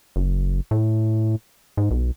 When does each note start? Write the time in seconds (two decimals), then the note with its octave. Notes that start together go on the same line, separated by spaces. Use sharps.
0.16 F#1
0.71 A2
1.77 G#2
1.91 B1